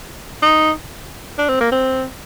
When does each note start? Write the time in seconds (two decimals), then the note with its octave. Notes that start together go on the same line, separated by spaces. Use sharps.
0.43 D#4
1.38 D4
1.49 C4
1.60 A#3
1.72 C4